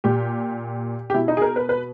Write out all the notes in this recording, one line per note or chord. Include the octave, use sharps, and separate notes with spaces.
A#2 G4
G4
B2 E4
D#4
G#4
A#4
B4
B4